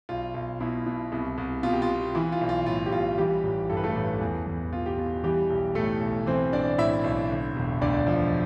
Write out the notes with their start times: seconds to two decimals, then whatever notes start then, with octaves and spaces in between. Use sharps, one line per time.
0.09 B1 F4
0.34 B1
0.60 B2 E4
0.86 B2
1.12 C2
1.38 C2
1.63 B2 F4
1.73 G4
1.82 F4
1.90 B2
2.15 E3 E4
2.32 F4
2.41 B1
2.49 F4
2.66 A2 F4
2.86 G4
2.92 B1 F4
3.18 E3 G3 G4
3.43 A1
3.69 G2 A4
3.77 B4
3.84 A3 A4
3.95 A1
4.21 E2
4.47 E2
4.72 B2 F4
4.86 G4
4.98 B2 F4
5.24 E3 G3 G4
5.50 B1
5.75 A2 A3 A4
6.01 B1
6.26 E3 C4 C5
6.53 B1 D4 D5
6.78 A2 E4 E5
7.04 B1
7.30 D3
7.56 E1
7.81 D2 D4 D5
8.07 F3